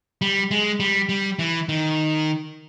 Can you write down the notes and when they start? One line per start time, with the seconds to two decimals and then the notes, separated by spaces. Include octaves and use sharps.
0.21 G3
0.51 G#3
0.80 G3
1.09 G3
1.39 E3
1.69 D#3